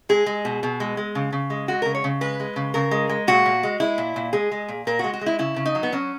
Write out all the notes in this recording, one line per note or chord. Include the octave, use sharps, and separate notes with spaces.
G#3 G#4
G#3
B2
B2
G#3
G#3
C#3
C#3
G#3
G#3 F#4
C#3 A#4
C#5
C#3
G#3 B4
G#3
C#3
C#3 A#4
G#3
G#3
A#2 F#4
A#2
G#3
G#3 E4
A#2
A#2
G#3 G#4
G#3
A#2
A#2 A#4
G#3 F#4
F#4
G#3
E4
C#3 E4
C#3
D#4
F#3
B3
F#3 C#4